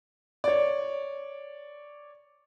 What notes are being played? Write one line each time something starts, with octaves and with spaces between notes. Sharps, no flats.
C#5 D5